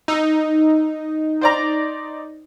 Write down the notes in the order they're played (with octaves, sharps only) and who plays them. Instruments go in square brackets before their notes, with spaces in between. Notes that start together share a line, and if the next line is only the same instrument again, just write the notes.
[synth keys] D#4 [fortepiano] E6
[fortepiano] C5 D5 A#5